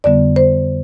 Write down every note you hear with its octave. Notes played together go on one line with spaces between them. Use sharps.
F2 D3 G3 B3 D5
C5